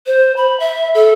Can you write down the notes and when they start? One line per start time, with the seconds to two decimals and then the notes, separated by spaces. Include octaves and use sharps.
0.06 C5
0.37 B5
0.60 E5
0.95 A4